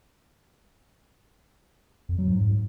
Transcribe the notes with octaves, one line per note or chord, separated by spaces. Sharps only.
F2
F#3
G#2